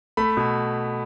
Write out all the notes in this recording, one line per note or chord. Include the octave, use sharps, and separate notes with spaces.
A3 B5
B2